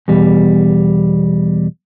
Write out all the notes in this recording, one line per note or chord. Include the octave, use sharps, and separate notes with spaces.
E2 B2 G3